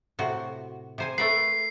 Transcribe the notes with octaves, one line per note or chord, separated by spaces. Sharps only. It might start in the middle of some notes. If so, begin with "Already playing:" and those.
A2 C3 F#4
C3 C5 G#5
A3 A#4 B4 C7